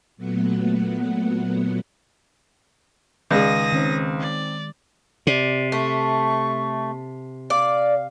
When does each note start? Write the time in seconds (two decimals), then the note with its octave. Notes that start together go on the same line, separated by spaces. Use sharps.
0.17 A#2 F#3 A3 B3 F#5
3.31 C#2 D#3 G#3 G#4 D5 D#6 A#6
3.73 D#3 C4 C#4 D#4
4.20 D5
5.27 C3 D5
5.72 A3 C#6
7.50 D5 F5